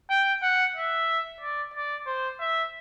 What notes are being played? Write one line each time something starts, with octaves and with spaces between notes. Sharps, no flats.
G5
F#5
E5
D5
D5
C5
E5